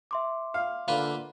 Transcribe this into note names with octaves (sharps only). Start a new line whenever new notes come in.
E5 C6 D6
F5
D3 A#3 F4 B4